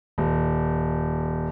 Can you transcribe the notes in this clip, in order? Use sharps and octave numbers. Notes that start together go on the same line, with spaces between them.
D#1